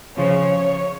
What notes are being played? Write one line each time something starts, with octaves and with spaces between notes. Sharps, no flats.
C#3 F3 C#5